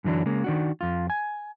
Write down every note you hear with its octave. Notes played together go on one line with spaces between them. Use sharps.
F#2 D3 E3 F#3 D4
C#3 G#3 A#3
D#3 D4 F#4
F2 F4
G#5